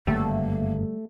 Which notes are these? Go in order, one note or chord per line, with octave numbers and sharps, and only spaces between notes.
G1 F#2 C#3 G3 A3 A#3